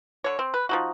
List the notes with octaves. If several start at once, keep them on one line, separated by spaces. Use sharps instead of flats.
D3 C#5
C4
B4
F3 D#4 F#4